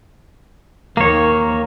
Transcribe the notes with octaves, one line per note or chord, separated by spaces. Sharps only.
D#2 D#3 A#3 C#5